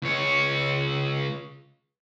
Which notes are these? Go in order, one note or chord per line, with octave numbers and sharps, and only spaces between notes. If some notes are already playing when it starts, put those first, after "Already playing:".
C#2 C#5